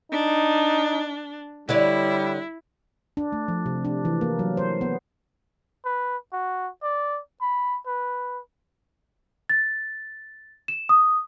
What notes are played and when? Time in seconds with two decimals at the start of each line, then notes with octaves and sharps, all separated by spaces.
0.12 D4 D#4
1.69 D3 G3 E4 C#5 D5
3.17 D4
3.32 A3
3.48 F3
3.66 C3
3.85 D4
4.05 E3
4.21 A#3
4.39 F#3
4.57 C5
4.81 B3
5.85 B4
6.33 F#4
6.83 D5
7.41 B5
7.87 B4
9.49 A6
10.68 E7
10.89 D#6